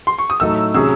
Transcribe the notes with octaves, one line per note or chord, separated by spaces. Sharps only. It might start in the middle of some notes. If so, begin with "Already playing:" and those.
C6
C#6
D#6
A2 F#3 A3 D#4 E6
C3 F#3 C#4 G#4 E6